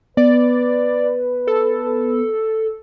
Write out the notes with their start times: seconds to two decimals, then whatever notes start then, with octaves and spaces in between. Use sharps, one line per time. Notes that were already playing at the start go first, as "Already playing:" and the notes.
0.17 B3 B4 D5
1.47 A4